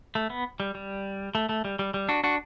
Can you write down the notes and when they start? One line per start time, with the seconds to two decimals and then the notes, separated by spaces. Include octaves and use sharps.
0.15 A3
0.30 B3
0.60 G3
0.75 G3
1.35 A3
1.49 A3
1.65 G3
1.79 G3
1.94 G3
2.09 D4 F#4
2.24 D4 F#4